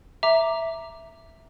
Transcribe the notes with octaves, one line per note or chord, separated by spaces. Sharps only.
E5 A#5 D6